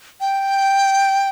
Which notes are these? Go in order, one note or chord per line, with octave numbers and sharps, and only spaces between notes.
G5